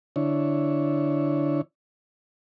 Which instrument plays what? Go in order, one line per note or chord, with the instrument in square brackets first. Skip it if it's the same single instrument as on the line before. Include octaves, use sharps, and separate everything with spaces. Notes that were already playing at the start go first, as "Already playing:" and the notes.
[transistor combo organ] D3 D4 E4 C#5